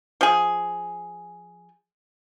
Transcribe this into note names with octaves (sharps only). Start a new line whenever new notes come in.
F3 G#4